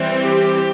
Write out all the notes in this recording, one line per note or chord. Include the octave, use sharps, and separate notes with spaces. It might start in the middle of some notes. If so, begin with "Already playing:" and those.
Already playing: E3 G3 C4
G4